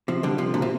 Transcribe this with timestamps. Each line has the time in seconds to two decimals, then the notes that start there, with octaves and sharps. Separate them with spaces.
0.08 C3 F3
0.23 D3 G3
0.38 C3 F3
0.54 A#2 D3
0.62 C3